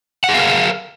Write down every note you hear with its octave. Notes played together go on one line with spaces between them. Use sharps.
G#4 A#4 F5 F#5